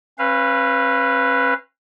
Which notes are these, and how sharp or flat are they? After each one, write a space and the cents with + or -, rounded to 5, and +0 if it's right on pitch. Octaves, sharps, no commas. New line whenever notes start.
C#4 -45 B4 +0 F5 -20